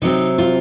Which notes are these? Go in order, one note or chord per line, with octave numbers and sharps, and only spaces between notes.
C3 F#3 C4 D#4
F4